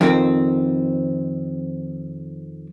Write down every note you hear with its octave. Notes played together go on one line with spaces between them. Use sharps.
F2 D#3 C4